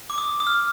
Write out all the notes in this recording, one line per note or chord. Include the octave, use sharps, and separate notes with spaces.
D6
D#6
D#6
F6